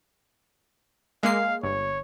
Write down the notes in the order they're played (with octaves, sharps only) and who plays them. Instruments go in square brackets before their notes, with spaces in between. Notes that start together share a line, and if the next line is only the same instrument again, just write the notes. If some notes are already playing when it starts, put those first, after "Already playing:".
[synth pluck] G#3 A#3 C7 [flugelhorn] F5
[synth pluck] G1 [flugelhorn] C#5